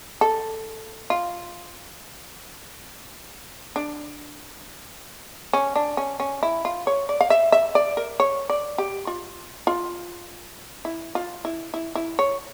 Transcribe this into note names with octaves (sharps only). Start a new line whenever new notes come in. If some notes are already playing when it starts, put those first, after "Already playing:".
A4
F4
D4
C#4
D4
C#4
C#4
E4
F4
C#5
D5
F5
E5
E5
D5
A#4
C#5
D5
G4
F4
F4
E4
F4
E4
E4
E4
C#5